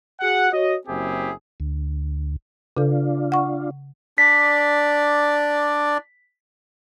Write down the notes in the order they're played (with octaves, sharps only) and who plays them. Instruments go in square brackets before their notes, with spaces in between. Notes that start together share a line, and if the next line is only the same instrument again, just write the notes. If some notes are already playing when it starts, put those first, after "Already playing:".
[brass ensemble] F#4 G#4 F#5
F#4 C#5 D#5
F#1 C4 E4 G4 G#4
[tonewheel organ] D2
[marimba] C#3 A4 [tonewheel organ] D4 F4
[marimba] F#5 C#6
[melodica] D4 D5 [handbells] B6